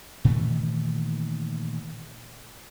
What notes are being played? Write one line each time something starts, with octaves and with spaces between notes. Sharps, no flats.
A#2 D#3 E3 A3